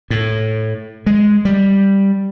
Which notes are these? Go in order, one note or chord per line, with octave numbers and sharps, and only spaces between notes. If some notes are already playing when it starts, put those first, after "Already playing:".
A2
G#3
G3